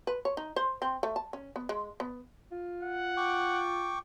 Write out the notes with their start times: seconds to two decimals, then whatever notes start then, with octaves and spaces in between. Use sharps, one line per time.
0.07 B4
0.25 C#5
0.37 D#4
0.56 C5
0.82 C4
1.03 A3
1.16 A5
1.33 C#4
1.56 B3
1.69 G#3
2.00 B3
2.52 F4
2.83 F#5
3.17 G5 C#6 D6